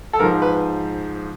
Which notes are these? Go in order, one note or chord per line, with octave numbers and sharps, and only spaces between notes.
A4
G#2 F3 A#4
B4